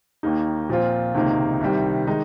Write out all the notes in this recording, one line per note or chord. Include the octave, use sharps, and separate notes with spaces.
D#2 D#3 A#3 D#4
A#2 F3 C4 F4
C#2 C3 D#3 A#3 D#4
C2 C3 D#3 G3
D#3 G#3 D#4